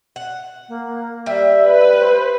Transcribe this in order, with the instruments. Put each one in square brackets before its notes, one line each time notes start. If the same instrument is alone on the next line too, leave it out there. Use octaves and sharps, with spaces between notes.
[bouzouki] F#5
[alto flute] A#3
[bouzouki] G3 [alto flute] E5
[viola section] B4
[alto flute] C5